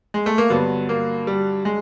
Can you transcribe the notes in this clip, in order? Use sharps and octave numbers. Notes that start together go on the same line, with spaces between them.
G#3
A3
A#3
G2 D3 F#3 B3
A#3
G3
G#3